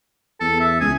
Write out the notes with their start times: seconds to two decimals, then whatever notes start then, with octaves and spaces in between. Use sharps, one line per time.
0.41 E2 A4
0.60 E5
0.81 C#2 G#4